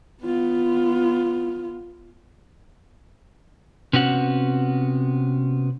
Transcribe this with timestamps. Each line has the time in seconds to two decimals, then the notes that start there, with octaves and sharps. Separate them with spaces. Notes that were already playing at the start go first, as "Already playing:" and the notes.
0.22 B3 F4
3.93 C3 B3 C#4 F#4 F#5